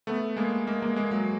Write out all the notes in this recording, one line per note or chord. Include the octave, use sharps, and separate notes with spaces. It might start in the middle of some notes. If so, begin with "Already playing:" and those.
A3 B3
G#3 A#3
G#3 A#3
G#3 A#3
G#3 A#3
F#3 G#3